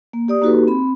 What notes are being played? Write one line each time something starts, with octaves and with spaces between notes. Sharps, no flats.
A#3
G4 D5 D#6
A#3 D#4 F#4 G4 A4 B4
C4 B5